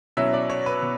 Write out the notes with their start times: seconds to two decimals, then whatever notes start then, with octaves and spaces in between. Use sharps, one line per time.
0.17 B2 F#3 C#4 E4 E5
0.33 D5
0.50 C#5
0.66 B4
0.82 B2